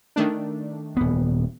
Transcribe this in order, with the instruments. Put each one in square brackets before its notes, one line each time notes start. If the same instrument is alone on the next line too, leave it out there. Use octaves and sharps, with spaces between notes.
[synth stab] D#3 A3 D4
[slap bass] D#1 B3